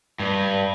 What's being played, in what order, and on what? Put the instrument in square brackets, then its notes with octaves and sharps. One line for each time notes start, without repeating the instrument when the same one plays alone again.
[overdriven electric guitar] G2